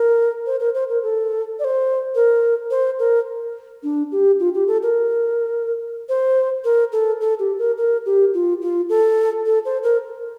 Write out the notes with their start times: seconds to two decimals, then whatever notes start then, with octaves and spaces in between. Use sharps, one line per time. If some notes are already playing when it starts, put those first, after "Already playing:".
Already playing: A#4
0.46 C5
0.60 A#4
0.74 C5
0.89 A#4
1.03 A4
1.59 D5
1.64 C5
2.15 A#4
2.71 C5
2.99 A#4
3.83 D4
4.12 G4
4.40 F4
4.54 G4
4.67 A4
4.83 A#4
6.09 C5
6.64 A#4
6.92 A4
7.21 A4
7.39 G4
7.59 A#4
7.78 A#4
8.06 G4
8.34 F4
8.62 F4
8.89 A4
9.46 A4
9.65 C5
9.83 A#4